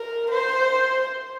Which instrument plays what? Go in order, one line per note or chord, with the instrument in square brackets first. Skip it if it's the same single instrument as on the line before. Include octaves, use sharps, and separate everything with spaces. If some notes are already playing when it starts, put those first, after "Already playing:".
Already playing: [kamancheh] A#4
C5